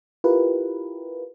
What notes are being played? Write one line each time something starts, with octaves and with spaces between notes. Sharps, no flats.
E4 F4 G4 A#4 B4